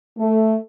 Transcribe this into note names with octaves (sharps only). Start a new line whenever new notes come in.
A3